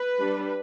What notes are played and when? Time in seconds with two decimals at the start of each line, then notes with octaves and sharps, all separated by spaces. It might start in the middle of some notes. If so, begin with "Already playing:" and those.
Already playing: B4
0.19 G3 D4